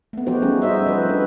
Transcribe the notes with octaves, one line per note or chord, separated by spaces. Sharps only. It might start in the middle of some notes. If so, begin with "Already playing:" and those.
A3 B3
F3 D#4 F#4 G4 C5
G3 C#4 D#4 G#4
D#4 F#4 C5 D#5 E5
F3 A3 B4 C5
D4 B4